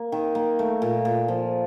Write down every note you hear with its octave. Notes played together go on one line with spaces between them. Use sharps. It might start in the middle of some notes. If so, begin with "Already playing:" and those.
Already playing: A#3
D#3
A#3
A3
A#2
A#2
F3